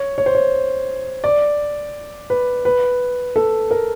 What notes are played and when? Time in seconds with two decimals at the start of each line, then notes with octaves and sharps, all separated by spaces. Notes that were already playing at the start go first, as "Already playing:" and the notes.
Already playing: C#5
0.18 C#5
0.26 C5
0.35 C#5
1.24 D5
2.30 B4
2.65 B4
3.36 A4
3.71 A#4